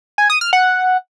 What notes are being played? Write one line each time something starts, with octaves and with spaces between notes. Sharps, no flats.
G#5
D#6
F6
F#5